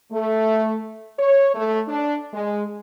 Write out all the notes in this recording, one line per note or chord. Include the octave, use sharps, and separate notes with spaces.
A3
C#5
A3
D4
G#3